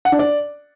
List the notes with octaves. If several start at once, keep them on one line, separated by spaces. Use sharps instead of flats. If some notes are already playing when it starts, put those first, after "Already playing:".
F#5
D4
D5